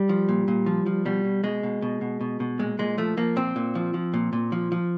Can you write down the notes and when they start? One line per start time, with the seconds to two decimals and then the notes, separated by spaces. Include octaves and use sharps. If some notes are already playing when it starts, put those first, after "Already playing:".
Already playing: G3
0.09 F3
0.29 A#2
0.48 A#2
0.66 F3
0.86 F3
1.05 B2 G3
1.25 B2
1.44 B2 G#3
1.63 B2
1.82 B2
2.01 B2
2.21 B2
2.40 B2
2.59 A#2 G#3
2.79 A#2 G#3
2.98 F3 A3
3.17 F3 A#3
3.36 A#2 C4
3.56 A#2
3.75 F3
3.94 F3
4.14 A#2
4.33 A#2
4.52 F3
4.72 F3